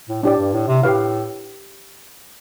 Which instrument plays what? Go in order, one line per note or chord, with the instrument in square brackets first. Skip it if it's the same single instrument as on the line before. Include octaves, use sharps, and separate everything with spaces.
[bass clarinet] A2
[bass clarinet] A2 [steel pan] D4 G4 D5
[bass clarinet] G2
A2
C3
[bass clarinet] A2 [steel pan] G4 B4 F5